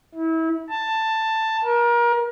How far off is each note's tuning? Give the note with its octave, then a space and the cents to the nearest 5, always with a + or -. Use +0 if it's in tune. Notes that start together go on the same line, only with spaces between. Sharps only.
E4 -30
A5 +10
A#4 +30